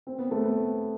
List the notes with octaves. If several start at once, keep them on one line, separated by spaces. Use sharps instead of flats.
C4
B3
A3
B3